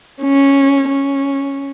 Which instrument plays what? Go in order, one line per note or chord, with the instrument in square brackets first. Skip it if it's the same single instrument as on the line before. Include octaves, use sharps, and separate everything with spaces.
[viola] C#4
C#4